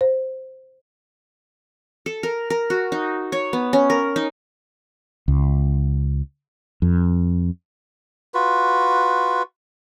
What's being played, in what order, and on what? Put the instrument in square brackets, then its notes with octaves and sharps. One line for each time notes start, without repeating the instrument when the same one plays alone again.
[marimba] C5
[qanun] A4
A#4
A#4
F#4
D#4
C#5
B3
C#4
A#4
D#4
[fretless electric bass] C#2
F2
[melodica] F4 F#4 B4